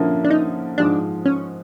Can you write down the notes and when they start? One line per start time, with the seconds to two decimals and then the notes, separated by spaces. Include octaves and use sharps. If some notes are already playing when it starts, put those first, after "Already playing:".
Already playing: D3 F3 A#3 C#4 E4
0.24 D4
0.30 D#4
0.78 G#2 F3 G#3 D4
1.26 C#4